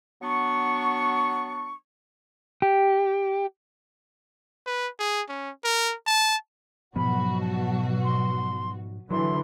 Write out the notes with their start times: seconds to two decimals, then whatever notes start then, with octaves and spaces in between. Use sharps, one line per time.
0.22 F#3 B3 D4 C#6
2.62 G4
4.66 B4
4.99 G#4
5.29 C#4
5.64 A#4
6.07 A5
6.96 G#2 B2 F3 F#3 B3 F#4 B5
7.41 A5
8.04 C6
9.11 D3 E3 F#3 C6